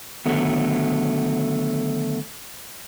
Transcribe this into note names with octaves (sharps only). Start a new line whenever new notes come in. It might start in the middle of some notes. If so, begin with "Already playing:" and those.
D3 D#3 F#3 A3 B3